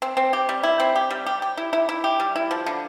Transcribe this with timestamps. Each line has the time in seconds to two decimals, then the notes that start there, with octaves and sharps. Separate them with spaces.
0.02 C4
0.17 C4
0.33 G4
0.49 G3
0.63 E4
0.80 C4
0.96 G4
1.11 G3
1.26 G4
1.42 G4
1.57 E4
1.73 E4
1.89 E4
2.04 G4
2.20 G3
2.36 E4
2.51 F3
2.66 D3